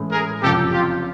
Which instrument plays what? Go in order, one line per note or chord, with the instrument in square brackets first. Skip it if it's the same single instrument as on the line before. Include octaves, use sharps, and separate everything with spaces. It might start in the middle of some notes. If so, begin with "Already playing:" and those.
Already playing: [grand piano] A2 E3 G#3 C#4 E4
[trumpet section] G#4 A#4
[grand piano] F#1 F2 C3 F3 [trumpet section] G4 A4
[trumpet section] F4 G4